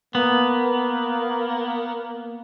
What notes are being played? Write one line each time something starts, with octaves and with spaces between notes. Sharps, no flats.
A#3 B3